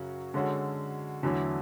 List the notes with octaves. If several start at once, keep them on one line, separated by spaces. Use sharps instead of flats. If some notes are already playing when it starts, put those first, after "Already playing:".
Already playing: F#2 C#3 F#3 C#4 F#4
D3 G#3 C#4 F#4 A4
E2 D3 F#3 A3 E4